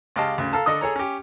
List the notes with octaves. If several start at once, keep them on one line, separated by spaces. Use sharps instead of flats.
C#2 G4 D#5 F5 A5
D2 C#3
A4 F5 A5 A#5
D3 A4 D#5 D#6
G#4 A4 C#5 A#5
C#4 G4